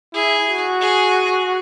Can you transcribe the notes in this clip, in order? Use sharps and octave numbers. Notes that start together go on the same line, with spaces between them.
E4 G#4
F#4
G#4